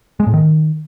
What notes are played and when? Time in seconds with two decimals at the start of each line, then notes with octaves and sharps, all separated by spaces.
0.20 G#3
0.27 A2
0.34 D#3